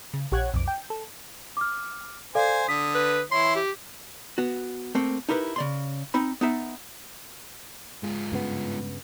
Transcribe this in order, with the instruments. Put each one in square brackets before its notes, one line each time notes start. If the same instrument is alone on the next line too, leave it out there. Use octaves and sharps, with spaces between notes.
[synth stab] C#3
A#1 G4 C#5 F#5 F#6 G#6
B1 F2 D6
G5
A4
[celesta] D6 F6
[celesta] A4 D5 F5 [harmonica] C5 G#5
[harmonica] D3 D#6 [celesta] B6
[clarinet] B4
[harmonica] E3 E4 C#5 [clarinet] C6
[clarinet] G4
[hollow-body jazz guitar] B3 F#4
A3 A#3 C4
D#4 E4 G4 A#4 B4
C#3 D5 C6
C4 D#4 B5
B3 D#4 E5
[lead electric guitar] G#2 F4 [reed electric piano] G#3
[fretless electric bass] G2 C#3 B3